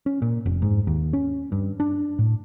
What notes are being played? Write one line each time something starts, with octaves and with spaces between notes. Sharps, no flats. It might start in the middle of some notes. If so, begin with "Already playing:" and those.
C#4
A#2
F1
G#2
D#2
C#4
G2
D4
A2